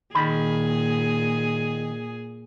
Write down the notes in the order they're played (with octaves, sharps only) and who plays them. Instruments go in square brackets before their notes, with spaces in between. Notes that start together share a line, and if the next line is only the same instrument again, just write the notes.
[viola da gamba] A#2 G#4 [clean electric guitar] D#3 B5